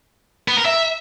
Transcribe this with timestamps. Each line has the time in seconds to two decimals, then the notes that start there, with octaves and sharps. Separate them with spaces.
0.48 B3
0.57 A#4
0.66 E5